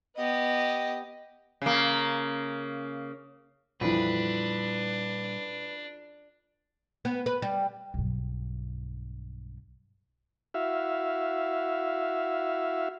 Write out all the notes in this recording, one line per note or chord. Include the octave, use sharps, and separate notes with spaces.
B3 G4 D#5
C#3 A#3
F2 A#2 E3 G3 D4 B4
B3
B4
G3
B1 G2
E4 F#4 E5 F5